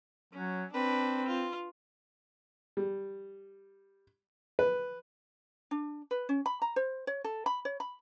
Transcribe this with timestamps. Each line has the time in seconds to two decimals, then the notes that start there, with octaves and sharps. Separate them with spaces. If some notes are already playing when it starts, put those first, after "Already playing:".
0.33 F#3 C#4
0.73 C4 D4 B4
1.26 F4
2.77 G3
4.59 B4
5.71 D4
6.11 B4
6.29 C#4
6.46 B5
6.62 A#5
6.76 C5
7.07 C#5
7.24 A4
7.46 B5
7.65 C#5
7.80 B5